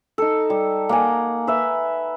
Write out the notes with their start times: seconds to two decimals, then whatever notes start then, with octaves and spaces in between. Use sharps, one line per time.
0.18 D#4 A4
0.50 G3
0.89 A#3 F#5 G#5
1.47 B4 E5